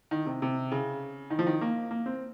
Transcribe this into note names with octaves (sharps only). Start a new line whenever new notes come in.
D#3
C3
C3
C#3
D#3
F3
D#3
A#3
A#3
C4